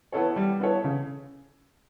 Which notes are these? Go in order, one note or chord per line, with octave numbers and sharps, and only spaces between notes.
B3 E4 A4 C#5
G3
B3 E4 A4 C#5
C#3